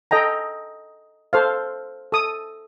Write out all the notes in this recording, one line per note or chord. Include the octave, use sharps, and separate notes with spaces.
A4 D#5 G5 A#5
A4 C5 F5
A4 D#6